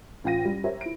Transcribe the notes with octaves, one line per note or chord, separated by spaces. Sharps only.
A1 F4 G5 A#6 D#7
G3
G4 A#4 C5 C#5 E5
E4 D7